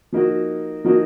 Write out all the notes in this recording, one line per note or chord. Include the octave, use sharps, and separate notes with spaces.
F3 A#3 D#4 F#4
F3 A#3 D#4 F#4